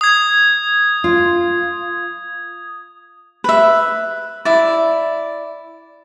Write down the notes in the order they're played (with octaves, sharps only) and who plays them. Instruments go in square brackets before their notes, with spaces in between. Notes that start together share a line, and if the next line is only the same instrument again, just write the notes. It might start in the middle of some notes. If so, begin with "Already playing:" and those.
[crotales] D#6 G#6
[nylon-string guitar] F4
[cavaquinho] B4 E5
E4 D5